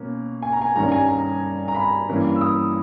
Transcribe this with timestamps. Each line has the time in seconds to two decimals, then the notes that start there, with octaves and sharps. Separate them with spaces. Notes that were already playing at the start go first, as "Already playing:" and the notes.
Already playing: B2 A#3 C#4
0.42 G#5
0.52 A#5
0.62 G#5
0.76 G2 D#3 G3 C#4 A#5
0.92 G#5
1.08 A#5
1.68 A#5
1.74 B5
2.09 G2 E3 A#3 C#4
2.36 E6
2.41 D#6